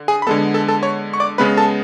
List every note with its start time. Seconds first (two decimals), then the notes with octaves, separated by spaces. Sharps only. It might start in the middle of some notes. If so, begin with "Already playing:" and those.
Already playing: D3
0.08 G#4 G#5
0.22 B5
0.27 D3 G#3 B3 A4 A5
0.54 A4 A5
0.68 A4 A5
0.83 C#5 C#6
1.13 C#6
1.20 D5 D6
1.38 C#3 G#3 B3 B4 B5
1.57 A4 A5